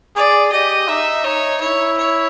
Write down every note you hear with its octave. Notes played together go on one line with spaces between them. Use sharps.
G#4 D5
G4 D#5
D#4 E5
D#4 C#5
E4 C#5
C#5